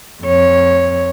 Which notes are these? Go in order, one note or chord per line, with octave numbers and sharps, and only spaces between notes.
F2 C#5